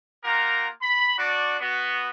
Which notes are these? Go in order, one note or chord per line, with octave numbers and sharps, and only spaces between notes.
A#3 F4 G4 A#4 F#5 A#5
B5
D4 F#4 D5
B3 F#4